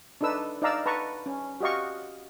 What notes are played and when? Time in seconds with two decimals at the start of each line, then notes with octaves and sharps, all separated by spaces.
0.21 D4 D#4 A4 B4 E6
0.62 D#4 D5 F5 A#5 E6
0.86 B4 A5 A#5 C#6
1.26 C#4
1.61 F#4 G4 D#5 F5 C#6